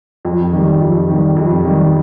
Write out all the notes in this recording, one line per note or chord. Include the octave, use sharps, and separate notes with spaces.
F2
D#3 G3
F2
D#3 G3
F2
D#3 G3